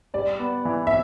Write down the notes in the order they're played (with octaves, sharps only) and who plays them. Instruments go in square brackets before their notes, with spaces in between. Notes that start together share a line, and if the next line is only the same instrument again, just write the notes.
[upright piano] G3 [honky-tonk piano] D5
[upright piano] B3
E3
[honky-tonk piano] E5